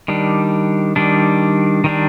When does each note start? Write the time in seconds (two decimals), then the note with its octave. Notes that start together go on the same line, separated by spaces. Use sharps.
0.08 D#3 G3 D4
0.96 D#3 G3 D4
1.84 D#3 G3 D4